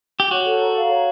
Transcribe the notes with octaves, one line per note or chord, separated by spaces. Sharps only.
G4
F#4 C#5
A4
A#5
F5
C#5